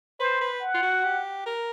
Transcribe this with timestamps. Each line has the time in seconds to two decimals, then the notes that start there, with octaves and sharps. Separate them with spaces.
0.19 B4 C5
0.41 B4
0.61 F#5
0.74 F4
0.83 F#4
1.04 G4
1.46 A#4